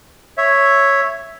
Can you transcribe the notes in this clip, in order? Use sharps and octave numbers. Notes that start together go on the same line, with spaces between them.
C#5 E5